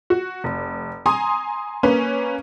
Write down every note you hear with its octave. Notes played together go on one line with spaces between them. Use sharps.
F#4
F1
G#5 A#5 C6 D#6
A#3 C#4 B4